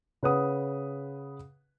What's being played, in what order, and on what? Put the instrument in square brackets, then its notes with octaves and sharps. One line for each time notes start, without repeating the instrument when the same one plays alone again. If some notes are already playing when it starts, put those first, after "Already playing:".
[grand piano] C#3 B4 F#5 D#6